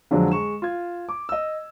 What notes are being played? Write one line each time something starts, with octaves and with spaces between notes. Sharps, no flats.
F2 D3 F3 F#3 G#3 D4
G#3 C#6 E7
F4 G#6
D6
D#5 E6